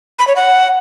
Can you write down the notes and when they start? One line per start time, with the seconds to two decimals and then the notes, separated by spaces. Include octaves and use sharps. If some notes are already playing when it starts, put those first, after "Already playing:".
0.19 B5
0.27 C#5
0.36 F#5